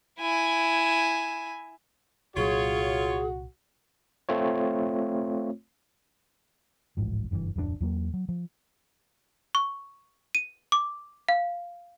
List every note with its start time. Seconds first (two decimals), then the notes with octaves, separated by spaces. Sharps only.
0.20 E4 G#5
2.36 C2 A#2 F#3 F4 F#4 G#4 C#5
4.29 A3 C4 F4 C#5
6.97 D1 A1 G#2 F3
7.31 F#1 G2 D#3 E3
7.56 D1 F2 F3 D4
7.80 E2 F#3 A#3
8.14 F#3
8.29 F3
9.55 C#6
10.35 D#7
10.72 D6
11.29 F5